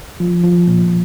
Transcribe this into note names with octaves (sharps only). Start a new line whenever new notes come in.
F3
F3
A#2